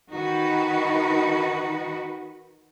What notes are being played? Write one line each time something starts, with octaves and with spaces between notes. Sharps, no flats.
D#3 D#4 F#4 B4